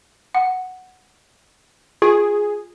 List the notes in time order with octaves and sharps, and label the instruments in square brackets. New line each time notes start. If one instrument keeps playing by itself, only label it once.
[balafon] F#5
[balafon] F4 [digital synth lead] G#4